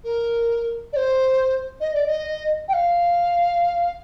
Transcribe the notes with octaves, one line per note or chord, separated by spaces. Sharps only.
A#4
D5
C5
D#5
D5
D#5
G5
F5